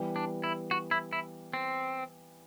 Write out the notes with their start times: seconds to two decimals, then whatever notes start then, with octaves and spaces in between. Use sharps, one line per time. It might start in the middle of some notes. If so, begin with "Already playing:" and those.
Already playing: E3 G3 B3
0.16 D4
0.44 E4
0.71 F#4
0.91 E4
1.13 E4
1.53 C4